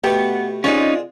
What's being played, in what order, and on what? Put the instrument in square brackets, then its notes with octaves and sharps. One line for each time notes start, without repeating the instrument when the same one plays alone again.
[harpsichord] B2 A3 B4 [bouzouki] B3 [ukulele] G4
[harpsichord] D3 C4 G#4 [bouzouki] G#3 F4 [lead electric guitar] C#4 D#4